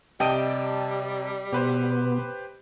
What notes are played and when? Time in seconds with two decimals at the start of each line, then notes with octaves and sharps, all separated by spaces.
0.20 C3 G3 D#5 G5 A5 D7
1.53 B2 B3 G4 B4 C5